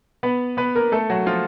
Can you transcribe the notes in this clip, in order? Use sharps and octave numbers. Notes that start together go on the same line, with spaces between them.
B3 B4
B3 B4
A#3 A#4
A3 A4
F#3 F#4
F3 F4